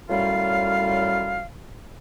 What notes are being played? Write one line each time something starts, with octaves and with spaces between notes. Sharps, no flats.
F#2 A2 G3 F4 F5